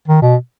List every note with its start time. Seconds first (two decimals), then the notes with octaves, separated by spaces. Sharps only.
0.08 D#3
0.22 B2